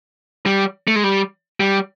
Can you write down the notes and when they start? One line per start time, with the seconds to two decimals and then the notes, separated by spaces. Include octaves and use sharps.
0.46 G3
0.88 A3
0.96 G#3
1.04 G3
1.60 G3